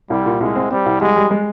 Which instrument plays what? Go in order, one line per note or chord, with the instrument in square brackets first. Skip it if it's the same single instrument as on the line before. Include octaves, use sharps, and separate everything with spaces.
[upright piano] C2 [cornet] G3
[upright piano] A#2
[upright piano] C2 [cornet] G#3
[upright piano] C4
[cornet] G3 [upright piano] C4
[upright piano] C2
[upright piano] G3 [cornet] G#3
[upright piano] G3
G#3